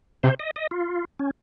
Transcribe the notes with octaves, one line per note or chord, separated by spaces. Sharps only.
C3 C5
D#5
D#5
F4
C#4